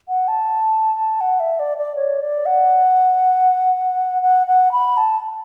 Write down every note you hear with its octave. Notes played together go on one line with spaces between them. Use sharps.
F#5
A5
F#5
E5
D5
D5
C#5
D5
F#5
F#5
F#5
B5
A5